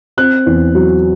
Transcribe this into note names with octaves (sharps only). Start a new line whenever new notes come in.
C4 F#6
E2
F#3